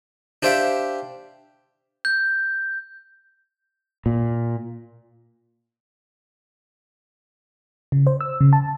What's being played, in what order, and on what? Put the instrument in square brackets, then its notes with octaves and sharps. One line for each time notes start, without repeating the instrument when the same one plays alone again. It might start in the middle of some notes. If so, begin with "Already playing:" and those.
[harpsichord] D4 G4 C5 E5 F5 G5
[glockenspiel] G6
[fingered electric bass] A#2
[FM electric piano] C#3
C5
E6
C#3
A5